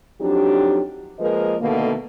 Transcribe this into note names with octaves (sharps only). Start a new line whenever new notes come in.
F2 F#3 D4 D#4 G4
F3 G#3 A#3 A#4 B4 D#5
B2 D3 D#3 A3 A#3